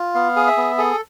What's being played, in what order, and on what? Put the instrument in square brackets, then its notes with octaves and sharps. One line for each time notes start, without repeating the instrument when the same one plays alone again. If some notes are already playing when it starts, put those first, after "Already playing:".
Already playing: [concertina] F4
B3 F5
G#4
E5
B3
G#4 A4